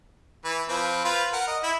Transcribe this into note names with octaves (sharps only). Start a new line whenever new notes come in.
E3 B4
F3 C4 B4
F4 B4 C5
A#4 F#5
D#5
E4 B5